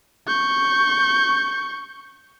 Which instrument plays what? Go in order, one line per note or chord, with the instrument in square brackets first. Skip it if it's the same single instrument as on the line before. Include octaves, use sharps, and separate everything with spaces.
[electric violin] C#6 G6